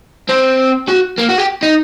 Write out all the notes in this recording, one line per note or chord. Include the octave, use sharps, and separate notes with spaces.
C4
F#4
A#3
F#4
G4
D#4